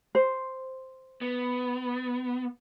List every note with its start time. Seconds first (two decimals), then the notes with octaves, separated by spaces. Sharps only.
0.15 C5
1.21 B3